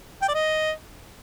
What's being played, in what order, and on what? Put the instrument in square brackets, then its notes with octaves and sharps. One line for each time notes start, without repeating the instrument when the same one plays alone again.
[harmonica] G5
D5
D#5